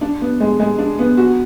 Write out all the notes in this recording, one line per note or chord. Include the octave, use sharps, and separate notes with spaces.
D4
B3
G#3
G#3
D4
B3
F#4